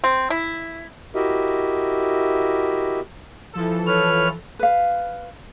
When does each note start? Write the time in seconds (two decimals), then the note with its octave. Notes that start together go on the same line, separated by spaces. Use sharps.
0.04 C4
0.30 E4
1.15 E4 F#4 G4 A#4 D#5 E5
3.53 E3 F3 A4
3.87 B4 C#5 F6
4.59 B4 F5